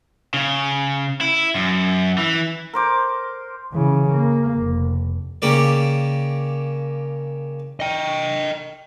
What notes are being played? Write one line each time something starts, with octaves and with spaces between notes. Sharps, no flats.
C#3
E4
F#2
E3
A#4 C5 D6
C#3 E3
A#3
F1
C#3 A#3 G4 D5
D#5 G5